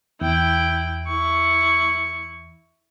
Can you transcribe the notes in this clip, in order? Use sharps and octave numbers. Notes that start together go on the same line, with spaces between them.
E2 E4 G5
E4 C#6